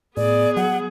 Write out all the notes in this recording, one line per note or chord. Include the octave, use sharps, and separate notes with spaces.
A2 B3 G#4 D5
F#3 F#5